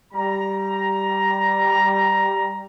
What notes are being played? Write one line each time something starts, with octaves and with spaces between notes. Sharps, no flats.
G3 A#5